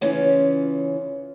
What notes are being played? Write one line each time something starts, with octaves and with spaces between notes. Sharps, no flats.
C#3 E3 C#4 F4